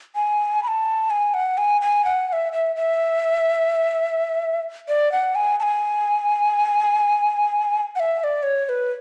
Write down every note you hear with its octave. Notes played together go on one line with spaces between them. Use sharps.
G#5
B5
A5
G#5
F#5
G#5
G#5
F#5
F#5
E5
E5
E5
D5
F#5
G#5
A5
G#5
F#5
E5
E5
D5
C#5
C#5
B4